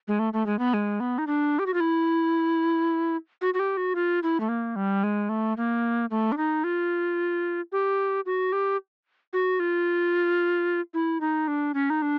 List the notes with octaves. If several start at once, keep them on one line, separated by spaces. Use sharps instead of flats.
G#3
A3
A3
G#3
B3
G#3
B3
D#4
D4
G4
F#4
F4
E4
F#4
F#4
G4
F#4
F4
E4
A3
A#3
G3
G#3
A3
A#3
A3
D4
D#4
F4
G4
F#4
G4
F#4
F4
E4
D#4
D4
C#4
D#4
D4